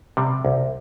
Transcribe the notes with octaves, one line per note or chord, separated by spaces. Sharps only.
C3 G3
C2